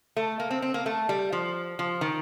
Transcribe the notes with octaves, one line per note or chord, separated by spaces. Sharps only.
A3
A#3
C4
C4
A#3
A3
G3
F3
F3
D#3